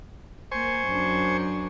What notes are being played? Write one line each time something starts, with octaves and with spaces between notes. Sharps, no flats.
A#3 C5 G#5 C#6
F#2 D4